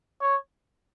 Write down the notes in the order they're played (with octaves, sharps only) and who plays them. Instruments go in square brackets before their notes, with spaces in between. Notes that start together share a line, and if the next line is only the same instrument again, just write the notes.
[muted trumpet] C#5